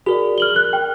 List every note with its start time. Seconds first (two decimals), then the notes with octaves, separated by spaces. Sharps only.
0.06 F#4 G#4 A#4 D5
0.38 F6 F#7 G7
0.56 A#4 F#6
0.73 G5